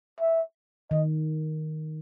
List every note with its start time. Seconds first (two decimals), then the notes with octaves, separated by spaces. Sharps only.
0.20 E5
0.91 D#3 D#5